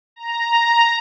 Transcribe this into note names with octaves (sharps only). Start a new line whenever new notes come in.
A#5